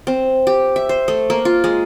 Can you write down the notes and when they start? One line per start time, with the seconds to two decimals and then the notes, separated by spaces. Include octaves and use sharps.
0.07 C4
0.47 G4
0.76 E5
0.89 C5
1.08 A3
1.30 A#3
1.45 F4
1.64 G#3